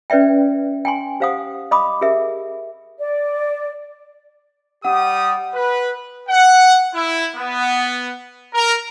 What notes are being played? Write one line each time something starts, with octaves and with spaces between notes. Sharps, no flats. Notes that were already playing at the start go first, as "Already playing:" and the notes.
C#4 B4 D5 E5 G5
G5 G#5 C6
G4 C5 F5 F#5 D#6
D#5 F5 B5 D6 D#6
G4 G#4 A#4 E5
D5
G3 G4 F#5 D#6
B4
F#5
E4
B3
A#4